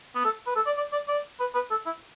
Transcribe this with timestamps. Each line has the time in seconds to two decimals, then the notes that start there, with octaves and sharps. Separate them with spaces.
0.15 B3
0.25 A4
0.47 B4
0.56 A4
0.66 D5
0.77 D5
0.92 D5
1.08 D5
1.40 B4
1.54 B4
1.71 A4
1.86 E4